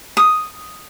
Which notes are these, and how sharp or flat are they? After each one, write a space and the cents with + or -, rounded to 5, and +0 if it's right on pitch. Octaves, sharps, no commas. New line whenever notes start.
D#6 +0